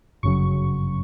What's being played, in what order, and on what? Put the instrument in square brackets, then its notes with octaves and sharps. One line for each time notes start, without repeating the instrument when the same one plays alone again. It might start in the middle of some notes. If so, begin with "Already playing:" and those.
[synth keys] G1 F#2 C#3 F#3 C#6